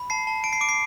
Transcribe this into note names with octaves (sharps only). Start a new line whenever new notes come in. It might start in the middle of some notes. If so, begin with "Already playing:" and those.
Already playing: B5
A5 C7
A5
A5 D7
C7
D6 D7
C7